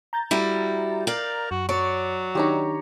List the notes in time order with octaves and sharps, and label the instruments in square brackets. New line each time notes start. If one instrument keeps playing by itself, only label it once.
[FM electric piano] A#5 G6 A6
[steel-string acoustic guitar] G3 E4 F#4
[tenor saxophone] A#4 [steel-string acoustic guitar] D5 F5
[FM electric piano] F#2 [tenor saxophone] F#4
[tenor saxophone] F#3 [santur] C#5 D6 [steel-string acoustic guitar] D5
[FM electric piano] D#3 D4 D#4 [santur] G4 C#5 A#5